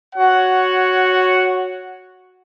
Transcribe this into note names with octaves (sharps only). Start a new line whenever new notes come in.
F#4 C#5 F#5